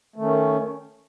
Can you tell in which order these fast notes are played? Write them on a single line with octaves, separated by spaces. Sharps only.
A3 D#3 C#4